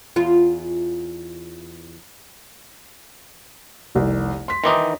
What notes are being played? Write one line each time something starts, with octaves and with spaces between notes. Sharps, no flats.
E2 F4
F1 C2
C6 B6
D#3 E3 D#4 C6 D6 D#6